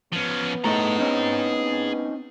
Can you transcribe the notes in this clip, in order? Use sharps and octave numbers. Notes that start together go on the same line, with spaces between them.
F3 B3 C#4
A2 A3 D#4 G#4 A#5
C4 C#4 D#4